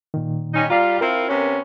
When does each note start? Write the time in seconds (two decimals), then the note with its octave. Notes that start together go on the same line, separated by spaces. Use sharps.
0.14 A#2 D#3
0.54 G3 C#4 D#4
0.70 G3 F4 D5 F5 A#5
1.01 C4 E4 F4 A#4
1.28 C3 B3 C#4